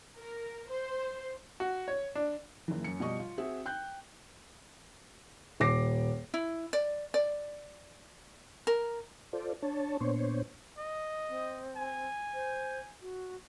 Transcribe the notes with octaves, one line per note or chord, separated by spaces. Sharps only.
A#4
C5
F#4
C#5
D4
F#1 E3
F#2 C#7
B2 F3 G3 D#5 C#6
F4
C4 F#4 G#4 E5
G5 F#6 G6
D#1 D6 A#6 C7
E4
D5
D5
A#4
F4 A4 C5 D5
D4 C#5 A5
A#2 B3 D4 C5 C#5
D#5
C4
G#5
C5
F#4